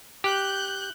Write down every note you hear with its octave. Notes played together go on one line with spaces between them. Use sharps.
G4 F#6 G6